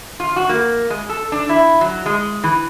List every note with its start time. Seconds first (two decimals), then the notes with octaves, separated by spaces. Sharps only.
0.20 F4
0.36 F#4
0.49 A#3
0.90 G#3
1.09 A4
1.32 D4
1.49 E4
1.81 F#3
2.06 G#3
2.44 E3